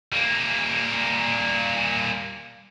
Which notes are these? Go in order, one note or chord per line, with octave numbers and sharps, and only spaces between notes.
G3 A#3